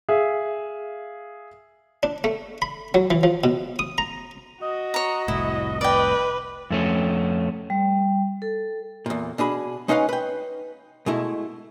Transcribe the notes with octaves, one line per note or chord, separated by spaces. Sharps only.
G#4 E5 F5
D4
A3
B5
F#3
E3
F3
B2
D#6
A#5
F#4 D#5
C#5 A#5
F1 C2 A2 E4
B4 D5 G5
F2 A3 C#4
G3
A4
E2 A#2
B2 D4 G#4 B5
G#3 C#4 D#4 B4 F5 F#5
B4 G5
B2 G#3 A3 E4